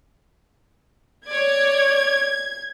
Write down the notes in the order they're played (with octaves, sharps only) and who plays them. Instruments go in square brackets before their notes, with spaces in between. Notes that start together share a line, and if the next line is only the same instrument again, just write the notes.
[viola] C#5 D5 [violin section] G#6